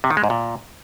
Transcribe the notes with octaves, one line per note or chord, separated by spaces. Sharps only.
C3
D#3
G#3
G#2
A#2